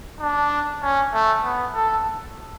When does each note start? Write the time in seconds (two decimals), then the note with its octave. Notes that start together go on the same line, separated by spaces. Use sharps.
0.20 D4
0.82 C#4
1.13 A3
1.44 B3
1.75 A4